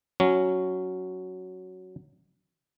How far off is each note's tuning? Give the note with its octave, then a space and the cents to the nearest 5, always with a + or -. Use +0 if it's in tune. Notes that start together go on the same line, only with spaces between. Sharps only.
F#3 +0 C#4 +0